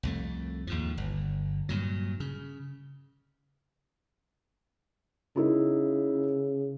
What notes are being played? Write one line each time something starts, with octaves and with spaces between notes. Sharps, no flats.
C2 F2 A3
D#2 G#2 F3
G1
G2 A#2 F#3
C#3
C#3 D#4 E4 A#4